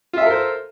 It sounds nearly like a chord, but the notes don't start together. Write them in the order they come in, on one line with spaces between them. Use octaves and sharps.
F4 E5 A4 A#4 C5